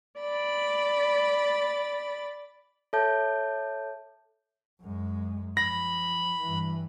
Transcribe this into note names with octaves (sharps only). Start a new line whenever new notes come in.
D5 B5 A6
A4 C#5 E5 A5 G6
F#2 G#3
F3 B5 A#6
G2 E3